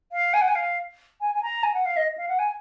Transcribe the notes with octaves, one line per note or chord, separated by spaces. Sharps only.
F5
G#5
F#5
G#5
F5
G#5
G#5
A#5
G#5
F#5
F5
D#5
F5
F#5
G#5